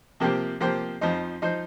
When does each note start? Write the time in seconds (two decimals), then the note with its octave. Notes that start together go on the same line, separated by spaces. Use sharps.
0.20 C3 F3 A#3 G4 C5
0.60 C3 F3 A#3 G4 C5
1.01 F2 F3 D#4 C5
1.42 F3 D#4 C5